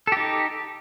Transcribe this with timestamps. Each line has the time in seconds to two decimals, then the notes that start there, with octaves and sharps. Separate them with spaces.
0.07 A4
0.12 G4
0.17 D#4